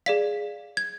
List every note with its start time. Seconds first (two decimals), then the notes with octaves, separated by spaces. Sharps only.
0.06 G#4 D5 F5 B6
0.77 G#6